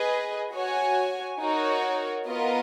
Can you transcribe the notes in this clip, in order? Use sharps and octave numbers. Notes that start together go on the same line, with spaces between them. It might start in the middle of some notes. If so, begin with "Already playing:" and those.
Already playing: G#4 B4 D#5
F#4 C#5 G#5
D#4 F#4 A#4 C#5
B3 F4 A#4 D#5